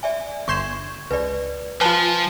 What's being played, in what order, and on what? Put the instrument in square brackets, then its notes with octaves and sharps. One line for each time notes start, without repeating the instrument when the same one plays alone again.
[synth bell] D5 E5 G#5
[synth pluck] G1 C6 E7 [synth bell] C#6 G6 G#6
[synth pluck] C#2 [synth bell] B4 D5
[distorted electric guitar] F3 [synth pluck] F4 B4 [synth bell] G#5 A5